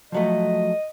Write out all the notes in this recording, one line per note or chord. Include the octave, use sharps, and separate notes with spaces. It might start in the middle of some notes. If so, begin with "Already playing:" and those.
F3 F#3 A3 D#5